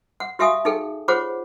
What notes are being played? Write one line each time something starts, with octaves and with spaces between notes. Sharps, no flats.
F#5
F#4 G4 E5 F5 G#5 D#6
D#4 G#4 A4 G5
F4 G#4 C5 C#5 F#5 D6